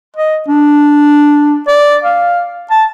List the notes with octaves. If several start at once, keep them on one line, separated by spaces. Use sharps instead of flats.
D#5
D4
D5
F5
A5